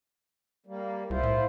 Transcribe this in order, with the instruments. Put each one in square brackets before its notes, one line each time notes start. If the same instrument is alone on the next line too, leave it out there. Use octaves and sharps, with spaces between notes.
[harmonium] G3 A#3
[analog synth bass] C2 [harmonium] E4 F4 C5
[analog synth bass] A2